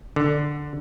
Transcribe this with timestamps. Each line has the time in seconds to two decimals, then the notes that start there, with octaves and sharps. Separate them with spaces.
0.16 D3